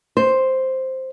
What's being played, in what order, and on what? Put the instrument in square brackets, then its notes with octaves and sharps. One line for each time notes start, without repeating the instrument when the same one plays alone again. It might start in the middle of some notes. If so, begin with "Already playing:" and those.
[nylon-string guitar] C5